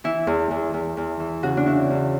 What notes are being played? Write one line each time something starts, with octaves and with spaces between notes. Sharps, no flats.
E3 E4
E2
E2
E2
E2
E3
C#3 F#4
D4
C#3 E4
E2